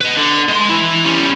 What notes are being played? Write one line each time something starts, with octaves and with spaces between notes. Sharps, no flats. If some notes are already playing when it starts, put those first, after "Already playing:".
B4 D#5
D3
G#3 C6
E3 E4
G3 C#4